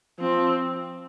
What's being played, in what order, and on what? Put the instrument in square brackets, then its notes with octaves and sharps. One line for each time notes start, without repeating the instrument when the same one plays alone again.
[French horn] F3 [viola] C4